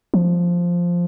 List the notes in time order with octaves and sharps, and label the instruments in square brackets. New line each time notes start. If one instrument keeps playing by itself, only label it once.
[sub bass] F3